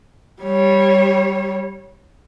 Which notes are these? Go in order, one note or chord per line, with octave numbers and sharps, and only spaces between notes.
G3 C#5